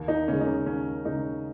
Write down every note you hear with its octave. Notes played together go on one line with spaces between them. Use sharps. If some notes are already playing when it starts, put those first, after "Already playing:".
Already playing: D#2
D#4
C#3 G#3 C#4
D#4
C#4
D#2 C#4
C#3 G#3 D#4